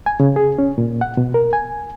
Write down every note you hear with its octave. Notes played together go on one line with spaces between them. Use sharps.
G#5
C#3
G#4
C#4
A#2
F#5
B2
A#4
G#5